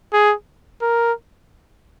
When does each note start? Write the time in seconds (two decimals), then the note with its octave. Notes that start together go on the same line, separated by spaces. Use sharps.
0.13 G#4
0.82 A#4